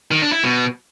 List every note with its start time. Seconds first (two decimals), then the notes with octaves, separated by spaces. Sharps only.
0.11 D#3
0.22 D4
0.32 E4
0.43 B2